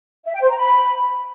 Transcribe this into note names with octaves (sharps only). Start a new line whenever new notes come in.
E5
G5
C5
A#5
B5